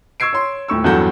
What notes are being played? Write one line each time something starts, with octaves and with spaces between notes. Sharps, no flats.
C#6 E6 G#6 C7 D7
C#5 C6
D#1 A2 C#6 E6
E2 G2 F#3 A4 F#5 G6